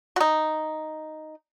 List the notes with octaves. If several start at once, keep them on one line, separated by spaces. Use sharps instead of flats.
F#4
D#4